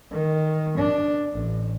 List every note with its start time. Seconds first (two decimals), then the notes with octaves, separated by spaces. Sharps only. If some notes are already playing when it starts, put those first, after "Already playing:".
0.11 D#3
0.77 D4
1.33 A1